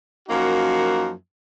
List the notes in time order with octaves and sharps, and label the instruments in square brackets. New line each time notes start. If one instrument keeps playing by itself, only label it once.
[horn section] F#2 F3 A#3 D#4 F#4